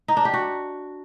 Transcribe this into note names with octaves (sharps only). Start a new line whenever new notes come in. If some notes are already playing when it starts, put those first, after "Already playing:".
D#4
D4
G4
F#4